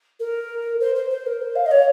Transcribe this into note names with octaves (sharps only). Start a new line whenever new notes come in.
A#4
C5
C5
C5
A#4
C5
F5
D#5
C#5